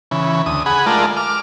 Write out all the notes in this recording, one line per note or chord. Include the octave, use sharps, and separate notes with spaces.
C#3 E3
D2 D#6
G#4 F#5 B5
G#3 A3 F4 A#4 D5
D6 F6